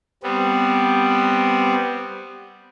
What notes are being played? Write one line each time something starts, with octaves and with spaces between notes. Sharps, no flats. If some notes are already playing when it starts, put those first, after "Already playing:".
G3 B3 C4